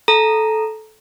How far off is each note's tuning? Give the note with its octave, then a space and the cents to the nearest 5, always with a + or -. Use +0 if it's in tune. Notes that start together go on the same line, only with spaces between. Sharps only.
A4 -15 A#5 +0